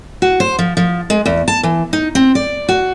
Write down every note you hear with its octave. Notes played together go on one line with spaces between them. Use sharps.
F#4
C5
F3
F3
G#3
E2
A5
E3
D#4
C4
D5
F#4